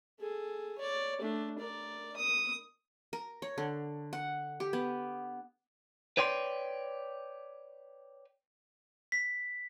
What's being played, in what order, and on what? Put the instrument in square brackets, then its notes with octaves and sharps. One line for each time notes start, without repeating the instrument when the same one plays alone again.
[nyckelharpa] G#4 A4
C#5 D5
A3 D4
A#4 D5
D#6
[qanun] A#4
C#5
D3
F#5
G4
B3
[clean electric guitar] B4 C#5 D5 G5 C6
[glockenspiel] B6